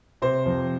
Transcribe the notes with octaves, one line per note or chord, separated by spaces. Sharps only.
C3 C5
F2